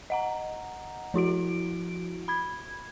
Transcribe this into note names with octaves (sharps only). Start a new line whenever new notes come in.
D#5 F#5 A#5
F3 E4 F#4 D7
B5 G#6